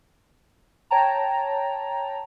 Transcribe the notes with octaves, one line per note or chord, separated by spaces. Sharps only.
C#5 G5 A5 A#5